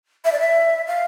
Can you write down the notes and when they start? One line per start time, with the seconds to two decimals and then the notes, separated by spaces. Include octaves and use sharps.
0.25 E5
0.32 D5
0.39 E5
0.87 F5